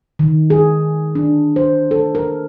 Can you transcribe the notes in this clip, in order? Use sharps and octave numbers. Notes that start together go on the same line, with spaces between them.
D#3
G#4
D4
C5
A4
A#4